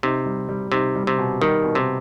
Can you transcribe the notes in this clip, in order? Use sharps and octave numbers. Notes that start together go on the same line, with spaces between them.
C3 D#4
G3
G3
C3 D#4
G3
C3
B2
D#3 G3
B2
C3